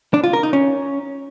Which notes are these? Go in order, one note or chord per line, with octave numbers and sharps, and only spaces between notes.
D4
F4
A#4
D#4
C#4